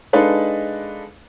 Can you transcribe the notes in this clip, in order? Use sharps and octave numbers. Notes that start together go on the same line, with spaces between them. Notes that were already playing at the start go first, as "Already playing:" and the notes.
G#3 D4 D#4 A4 B4 F5